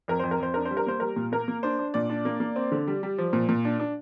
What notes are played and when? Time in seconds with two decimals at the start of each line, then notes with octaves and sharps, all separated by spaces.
0.08 F2 A#4
0.19 F2 C5
0.31 A#4
0.40 F2 C5
0.54 D4 A#4
0.65 C5
0.71 G3
0.77 A#4
0.87 A#3 C5
1.00 G3 A#4
1.16 A#2
1.32 A#3 A#4
1.48 A#3
1.63 D4 C5
1.79 D4
1.94 A#2 D5
2.10 D4
2.25 A#3
2.40 A#3
2.56 C4
2.72 D3
2.88 G3
3.03 G3
3.18 F3
3.33 A#2
3.49 A#2
3.65 D4
3.80 D4